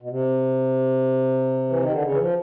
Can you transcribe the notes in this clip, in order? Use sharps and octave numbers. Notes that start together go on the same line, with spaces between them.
B2
C3
E3
D#3
D3
C#3
E3
F3